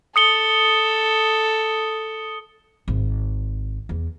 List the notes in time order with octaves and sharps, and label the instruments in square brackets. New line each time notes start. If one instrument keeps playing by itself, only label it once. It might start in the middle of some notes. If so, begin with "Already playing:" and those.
[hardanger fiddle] A4 [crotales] D#6 C#7 G7
[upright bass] G#1
E2